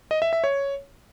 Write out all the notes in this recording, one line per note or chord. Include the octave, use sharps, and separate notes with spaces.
D#5
E5
E5
C#5